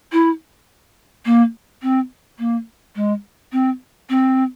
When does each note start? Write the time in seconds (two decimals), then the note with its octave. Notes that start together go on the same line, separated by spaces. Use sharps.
0.12 E4
1.25 A#3
1.82 C4
2.39 A#3
2.96 G#3
3.52 C4
4.09 C4